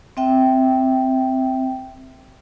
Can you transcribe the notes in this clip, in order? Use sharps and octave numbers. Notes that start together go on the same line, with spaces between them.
C4 E5 G5